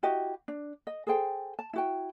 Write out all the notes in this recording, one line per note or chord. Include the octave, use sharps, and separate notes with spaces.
E4 F#4 G4 D#5
D4
D#5
G#4 A4 C5 G5
A5
E4 F#4 G5